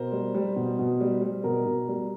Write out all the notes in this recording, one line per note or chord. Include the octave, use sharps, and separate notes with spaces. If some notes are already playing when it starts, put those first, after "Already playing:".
Already playing: B2 A#4 C5
G3
G3
B2
B2
G3
G3
B2 A#4
B2
G3